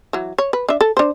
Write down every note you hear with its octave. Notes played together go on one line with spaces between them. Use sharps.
E3 F#3
C#5
B4
D4 E5
A4
D4 C5